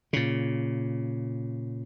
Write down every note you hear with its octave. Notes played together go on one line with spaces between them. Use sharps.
A#2 C#3